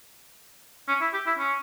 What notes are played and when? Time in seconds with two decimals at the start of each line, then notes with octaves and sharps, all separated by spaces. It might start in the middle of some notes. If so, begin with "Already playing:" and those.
0.88 C#4
1.01 E4
1.14 G4
1.26 E4
1.38 C#4